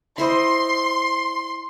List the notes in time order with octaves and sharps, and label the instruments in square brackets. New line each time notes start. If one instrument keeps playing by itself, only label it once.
[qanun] E4 C5 D#5 [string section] C6